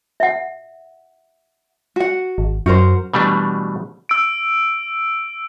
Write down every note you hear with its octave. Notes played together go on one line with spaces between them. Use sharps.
E5 F#5
F#4 F#5
G#1
F#2 F#4 A#4 C5
B2 E3 G3 A3 D4
E6 D7